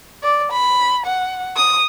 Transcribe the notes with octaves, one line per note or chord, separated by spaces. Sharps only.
D5
B5
F#5
D#6